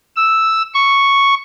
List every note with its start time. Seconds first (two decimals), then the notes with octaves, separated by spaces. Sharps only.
0.16 E6
0.74 C#6